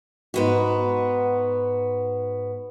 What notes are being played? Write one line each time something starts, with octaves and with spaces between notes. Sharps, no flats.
G#2 B3 F#4